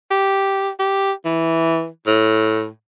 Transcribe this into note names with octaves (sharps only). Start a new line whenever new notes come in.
G4
G4
E3
A2